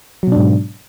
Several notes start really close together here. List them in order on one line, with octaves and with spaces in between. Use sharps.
F#3 B2 D4 G#2